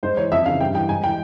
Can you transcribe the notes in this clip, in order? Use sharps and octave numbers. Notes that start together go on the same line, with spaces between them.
G#2 C5
E3 C#5
F2 E5
C#3 E3 F5
G2 G5
E3 G5
G#2 G#5
E3 G5